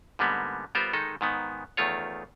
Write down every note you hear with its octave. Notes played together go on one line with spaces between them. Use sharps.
G#2 D3 G3 A#3 B3
G3 B3 F4 A#4 C5
D#3 G#3 D#4 A4
G#2 D#3 B3
E2 D#3 A3 F4 C#5